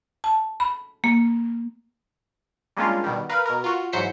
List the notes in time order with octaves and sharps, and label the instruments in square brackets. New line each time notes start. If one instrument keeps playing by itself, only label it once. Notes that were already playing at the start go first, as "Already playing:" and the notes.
[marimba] A5
B5
A#3
[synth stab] G3 G#3 A#3 C#4 D4 F4
B2 D#3 G3
A#4 B4 F5
B2 A#4
F4 F#4
G#2 E3 F#3 C5 B6 C#7